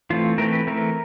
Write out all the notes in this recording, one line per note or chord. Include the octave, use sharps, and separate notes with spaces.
E3 A3 C4 F4
E3 A3 C4 A#4
B4
E3 A3 C4 A#4